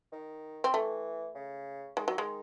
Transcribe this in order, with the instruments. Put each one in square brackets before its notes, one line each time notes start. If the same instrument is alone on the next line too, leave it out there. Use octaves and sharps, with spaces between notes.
[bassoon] D#3
[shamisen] C4
[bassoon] E3 [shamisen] A3
[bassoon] C#3
[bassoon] D#3 [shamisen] G#3
[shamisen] F#3
G#3